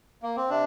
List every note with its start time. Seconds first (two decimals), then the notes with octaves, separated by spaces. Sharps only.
0.23 A#3
0.37 C4
0.50 C3 D4